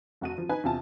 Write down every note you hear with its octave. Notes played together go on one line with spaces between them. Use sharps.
F1 F#4 D#7
F3
D#4 B4 G#5
E2 C3 F4 G#5 A5